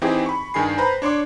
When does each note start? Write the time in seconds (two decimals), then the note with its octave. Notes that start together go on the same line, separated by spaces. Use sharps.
0.02 E3 C4 D#4 E4 G4 G#4
0.26 B5 C#6
0.54 G2 D#3 G#4 G#5 C7
0.78 B4 C5 A#5 B5
1.02 D4 C#5 C6 D6